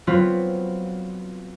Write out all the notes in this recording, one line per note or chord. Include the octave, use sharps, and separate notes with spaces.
F#3 B3 C4 F4 B4